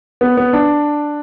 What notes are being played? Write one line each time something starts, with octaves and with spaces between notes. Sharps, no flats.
B3
B3
D4